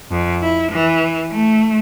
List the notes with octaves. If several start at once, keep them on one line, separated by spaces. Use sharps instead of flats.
F2
E4
E3
A3